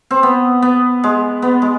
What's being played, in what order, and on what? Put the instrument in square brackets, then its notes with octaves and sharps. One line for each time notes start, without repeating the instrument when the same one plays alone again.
[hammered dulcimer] C4
B3
B3
G#3
B3
G#3